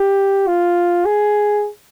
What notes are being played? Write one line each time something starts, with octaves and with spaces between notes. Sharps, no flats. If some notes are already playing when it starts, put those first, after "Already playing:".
Already playing: G4
F4
G#4